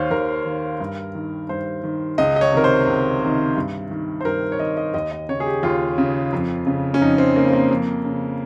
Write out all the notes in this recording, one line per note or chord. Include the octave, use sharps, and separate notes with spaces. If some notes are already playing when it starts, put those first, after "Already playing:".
Already playing: D#2 D#3 C5 C#5 F5
D#2 A#4
D#3
G2
D#3
G2 C5
D#3
C#2 D#5
D#5
C#5
C3 D#3 A#4
C5
C#2
C3 D#3
G2
D#3
C5
G2 A#4
C#5
D#3 D#5
D#5
D#2 D#5
D#5
C#3 C#5
G#4
G4
D#2 F4
C#3
F2
C#3
C#4
F2 D#4
C4
C#3 A#3
C4
A#3
F2
C#3